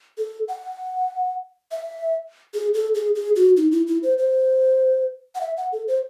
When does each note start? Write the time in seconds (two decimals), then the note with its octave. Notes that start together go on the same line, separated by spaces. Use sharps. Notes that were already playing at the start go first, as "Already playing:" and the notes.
0.18 A4
0.48 F#5
1.71 E5
2.54 G#4
2.74 A4
2.95 G#4
3.15 G#4
3.36 F#4
3.57 D#4
3.72 E4
3.87 E4
4.03 C5
4.18 C5
5.35 F#5
5.41 E5
5.57 F#5
5.72 A4
5.88 C5